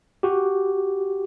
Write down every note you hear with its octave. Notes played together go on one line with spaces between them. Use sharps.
F#4 G4